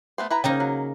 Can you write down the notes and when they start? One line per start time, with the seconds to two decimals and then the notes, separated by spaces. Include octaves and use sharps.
0.18 A3 B3 C5
0.30 E4 B4 A#5
0.44 C#3 A#3 D#4 G5
0.60 F#3